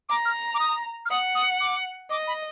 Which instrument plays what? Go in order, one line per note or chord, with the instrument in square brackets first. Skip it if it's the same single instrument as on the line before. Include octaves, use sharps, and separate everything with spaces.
[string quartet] A#5 [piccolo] D6
[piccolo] F6
D6
D#6
F6
[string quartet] F#5 [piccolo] D#6
[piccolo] D#6
D6
[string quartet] D#5 [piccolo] D6
[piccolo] B5